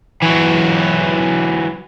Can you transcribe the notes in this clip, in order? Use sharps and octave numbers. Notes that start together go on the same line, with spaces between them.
E3 F#3